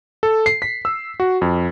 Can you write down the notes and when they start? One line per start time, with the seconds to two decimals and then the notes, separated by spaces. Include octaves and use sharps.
0.23 A4
0.46 C7
0.62 B6
0.85 E6
1.20 F#4
1.41 F2